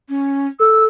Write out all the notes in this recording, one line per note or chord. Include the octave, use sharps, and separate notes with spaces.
C#4
A4 E6